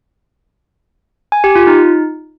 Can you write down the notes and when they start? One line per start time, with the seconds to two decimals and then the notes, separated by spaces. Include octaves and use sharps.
1.32 G#5
1.44 G4
1.55 F4
1.67 D#4